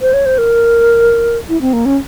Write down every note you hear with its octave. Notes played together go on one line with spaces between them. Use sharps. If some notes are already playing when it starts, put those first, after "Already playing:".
C5
C#5
C5
A#4
E4
C4
A#3
C#4